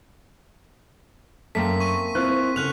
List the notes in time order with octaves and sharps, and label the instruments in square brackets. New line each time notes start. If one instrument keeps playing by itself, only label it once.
[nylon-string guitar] F#2 [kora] A3 A#3 C4 [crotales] B6
[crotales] C#6 D#7
[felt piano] C4 F#6 [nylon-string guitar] E4 [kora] F4
[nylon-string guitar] C#3 A4 [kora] F#5 [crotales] F6 F#6 F7